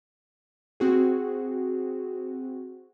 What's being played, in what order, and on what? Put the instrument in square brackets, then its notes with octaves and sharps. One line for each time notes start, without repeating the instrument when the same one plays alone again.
[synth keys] C4 F#4 G#4